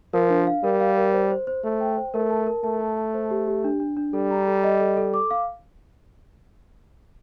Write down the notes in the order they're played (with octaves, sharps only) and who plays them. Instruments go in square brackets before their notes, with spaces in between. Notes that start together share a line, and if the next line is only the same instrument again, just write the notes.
[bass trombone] F3 [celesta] A#4
[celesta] D4
F5
[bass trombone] G3 [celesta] A#4
[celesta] F5
A#4
C5
C5
C5
[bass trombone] A3 [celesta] C5
[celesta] G5
C5
[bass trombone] A3 [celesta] A#4
[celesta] A5
A#4
[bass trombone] A3 [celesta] A5
[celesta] A5
A5
C5
G4
G4
D4
D4
D4
[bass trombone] G3 [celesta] A4
[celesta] A#5
A4
D#5
A4
A4
D6
F5